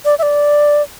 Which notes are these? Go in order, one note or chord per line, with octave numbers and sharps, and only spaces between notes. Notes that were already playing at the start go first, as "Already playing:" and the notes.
D5
E5
D5